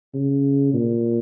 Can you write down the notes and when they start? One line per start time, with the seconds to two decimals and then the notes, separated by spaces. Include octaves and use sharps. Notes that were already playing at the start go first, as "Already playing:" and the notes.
0.14 C#3
0.74 A#2